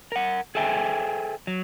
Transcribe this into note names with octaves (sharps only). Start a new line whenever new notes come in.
A#4 F#5
G#4 A4 C5 E5 G5 G#5
F#3